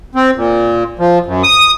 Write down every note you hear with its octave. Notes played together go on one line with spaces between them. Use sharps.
C4
A#2
F3
F#2
D#6